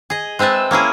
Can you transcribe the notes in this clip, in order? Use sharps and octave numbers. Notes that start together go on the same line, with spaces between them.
G#4 D#5
G#3 C4 B4 E5 A5
A#3 C#4 E4 G#4